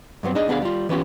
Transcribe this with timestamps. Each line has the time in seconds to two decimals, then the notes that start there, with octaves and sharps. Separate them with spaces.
0.23 G2 F#3 B3 C4
0.35 D4 D#4 G#4 D#5
0.48 D2 B3 D4 G#4 F5
0.62 G3 F4
0.89 E3 B3 C#4 F4 G4